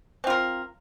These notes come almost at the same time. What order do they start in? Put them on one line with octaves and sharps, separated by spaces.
C4 F4 A#4